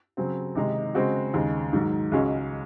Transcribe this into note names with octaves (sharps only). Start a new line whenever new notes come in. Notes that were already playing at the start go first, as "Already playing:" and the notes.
C#3 F#3 C4
C3 D#3 G#3 D#4
C#3 G#3 C4 F#4
D#2 C#3 G#3
G#2 D#3 F#3
C#2 C#3 G#3 C#4 F#4